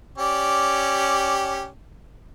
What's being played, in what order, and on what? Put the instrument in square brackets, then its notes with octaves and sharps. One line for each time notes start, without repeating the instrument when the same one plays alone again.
[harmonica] C#4 G4 D5